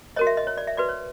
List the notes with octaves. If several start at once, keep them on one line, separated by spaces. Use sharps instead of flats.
F#4 A#4 C#5 D#5
E5
D#5
C#5
D5
E5
F#4 B4 D5
C#5